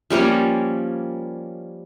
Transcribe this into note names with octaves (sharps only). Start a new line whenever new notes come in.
F3 G3 A#3 C#4